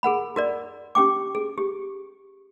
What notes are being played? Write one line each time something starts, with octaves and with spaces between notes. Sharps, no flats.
G#4 A#4 F#5 B5
F#4 A#4 D5
C#4 G4 G5 D6
G#4
G4